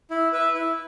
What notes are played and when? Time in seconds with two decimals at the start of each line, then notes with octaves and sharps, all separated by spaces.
0.10 E4
0.32 B4 E5
0.54 E4